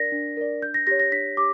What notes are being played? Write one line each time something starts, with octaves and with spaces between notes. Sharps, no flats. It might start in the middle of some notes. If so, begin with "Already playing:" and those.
Already playing: D4 A#4 D5 A#6 B6
D4
A#4 D5
D4 G6
A#6
G4 C#5 A#6
A#6
D4 B6
G4 D6